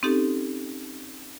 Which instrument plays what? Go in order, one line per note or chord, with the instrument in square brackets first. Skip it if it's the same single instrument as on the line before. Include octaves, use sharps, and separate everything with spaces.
[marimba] C4 C#4 D#4 G4 A4